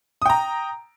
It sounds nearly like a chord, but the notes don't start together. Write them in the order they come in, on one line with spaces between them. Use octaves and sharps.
D#6 G5 A#5